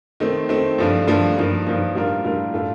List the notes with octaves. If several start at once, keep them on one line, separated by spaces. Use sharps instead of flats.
D#3 A3 C4
D#3 A3 C4
G2 F3 A3 D4
G2 F3 A3 D4
G2 F3 A#3 D#4
G2 F3 A#3 D#4
A2 G3 D4 F4 A#4
A2 G3 D4 F4 A#4
A2 A3 D4 F4